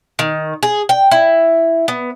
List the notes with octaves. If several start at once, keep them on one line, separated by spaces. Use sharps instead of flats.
D#3
G#4
G5
E4
B3